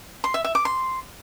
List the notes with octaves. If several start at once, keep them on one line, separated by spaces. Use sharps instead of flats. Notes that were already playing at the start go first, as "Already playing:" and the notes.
C6
E5
E5
D6
C6